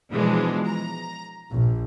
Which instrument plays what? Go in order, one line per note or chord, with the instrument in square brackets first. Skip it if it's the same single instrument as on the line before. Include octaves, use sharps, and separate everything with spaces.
[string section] B2 E3 F3 G#3 D4
A#5
A#1